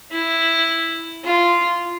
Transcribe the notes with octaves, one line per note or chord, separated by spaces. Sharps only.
E4
F4